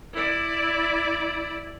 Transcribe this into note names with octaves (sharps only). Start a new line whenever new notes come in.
E4 D5